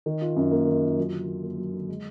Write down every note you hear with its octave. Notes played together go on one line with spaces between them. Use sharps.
D#3
F4
F#2
A#3
D#3
F4
F#3
D3
D3
A#3
F#3
D3
G#3